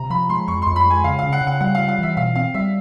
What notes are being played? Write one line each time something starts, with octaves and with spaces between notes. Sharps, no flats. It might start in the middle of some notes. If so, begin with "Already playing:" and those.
Already playing: C3 A#5
F3 B5
G#3 C6
F2 C#6
F2 C6
B5
G#3 G#5
C#3 F5
C#3 F5
F#5
C#3
F#5
G3 F#5
G3 F5
F5
E3 E5
B2 F5
C4 F5
G3 E5